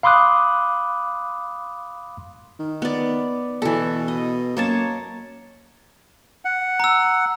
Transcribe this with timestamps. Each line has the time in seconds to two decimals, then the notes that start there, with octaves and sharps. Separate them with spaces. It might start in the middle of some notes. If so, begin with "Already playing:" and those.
0.03 F5 B5 C6 D6 D#6 F#6
2.59 D#3
2.82 B3 D5
3.62 B2 E3 A4
4.08 D#5
4.57 F#2 A#3 C#5 A5
6.45 F#5
6.80 A#5 E6